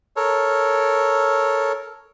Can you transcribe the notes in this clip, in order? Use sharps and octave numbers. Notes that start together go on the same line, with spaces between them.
A4 A#4 C#5